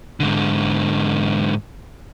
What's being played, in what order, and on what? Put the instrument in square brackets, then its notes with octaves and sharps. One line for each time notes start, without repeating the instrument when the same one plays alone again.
[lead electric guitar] G#2 D3